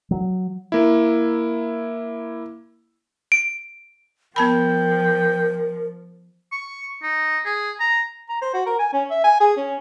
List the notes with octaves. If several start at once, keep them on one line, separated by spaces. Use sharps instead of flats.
F#3
A#3 E4
D7
F3 B3 A#4 G5 A5 B5
C#6
D#4
G#4
A#5
A#5
C5
F#4
A#4
G#5
C#4
E5
G#5
G#4
C#4